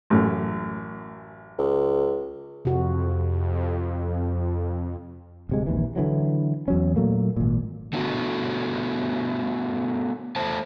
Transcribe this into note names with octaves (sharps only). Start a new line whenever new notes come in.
A1 F#2
C#2
F2 C3 F#4
D1 C3 G#3
A#1 D#2 E3
D3 E3 F#3
E2 F#3 C#4
A#2 F#3 A3 A#3
G#1 A#2
A3 B3 D4 F#4
A3 C5 A5